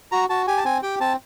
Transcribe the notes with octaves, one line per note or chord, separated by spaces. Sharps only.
F#4 A#5
F#4 A5
G4 G#5
A5
C4 G#5
G4 G5
C4 A5